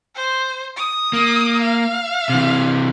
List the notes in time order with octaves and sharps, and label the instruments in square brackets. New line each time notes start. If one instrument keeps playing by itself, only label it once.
[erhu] C5
D#6
[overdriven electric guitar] A#3
[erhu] F5
[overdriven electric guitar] C3 E3